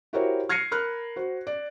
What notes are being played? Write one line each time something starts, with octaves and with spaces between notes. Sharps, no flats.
E4 F#4 G4 A#4 C5 C#5
F6 G#6 A#6 C7 C#7 D#7
A#4 B5 F6 F#6
F#4 C5
D5